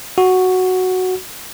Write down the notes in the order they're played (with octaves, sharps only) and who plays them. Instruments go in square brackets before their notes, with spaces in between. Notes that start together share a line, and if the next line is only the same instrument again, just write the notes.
[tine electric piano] F#4